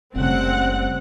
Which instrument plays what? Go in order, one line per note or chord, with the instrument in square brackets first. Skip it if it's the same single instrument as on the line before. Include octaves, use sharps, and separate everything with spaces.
[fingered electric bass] F#1 C#3 [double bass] G3 A3 [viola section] C4 F#5